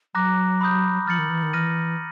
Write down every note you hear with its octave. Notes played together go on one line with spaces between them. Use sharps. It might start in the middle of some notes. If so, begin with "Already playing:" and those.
F#3 A#5 D6 F#6 A#6
B5 D#6 G6
F3 F6 A6 C#7 F#7
D#3
E3
D#3
E3 F6 A#6 D#7